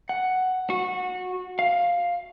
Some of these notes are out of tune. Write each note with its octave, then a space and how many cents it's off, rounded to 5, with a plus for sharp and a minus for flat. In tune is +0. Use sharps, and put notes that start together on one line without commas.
F#5 +5
F#4 -20
F5 +5